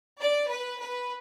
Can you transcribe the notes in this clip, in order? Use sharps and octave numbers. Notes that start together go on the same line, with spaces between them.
D5
B4
B4